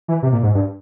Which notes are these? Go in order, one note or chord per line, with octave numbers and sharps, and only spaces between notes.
E3
C3
A#2
G#2
G2